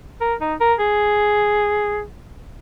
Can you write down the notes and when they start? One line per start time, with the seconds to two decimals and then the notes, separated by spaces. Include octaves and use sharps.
0.21 A#4
0.41 D#4
0.61 A#4
0.80 G#4